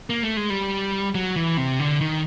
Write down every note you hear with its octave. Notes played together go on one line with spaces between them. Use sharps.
A#3
A3
G#3
G3
F#3
E3
C3
D3
D#3